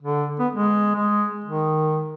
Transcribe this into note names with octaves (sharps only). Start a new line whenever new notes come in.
D3
B3
G#3
G#3
D#3